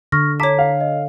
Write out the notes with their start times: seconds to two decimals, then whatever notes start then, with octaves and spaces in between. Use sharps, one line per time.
0.12 D3 C#6 F6 A#6
0.40 C#5 A5 A#5 D6 B6
0.59 F5
0.81 D#5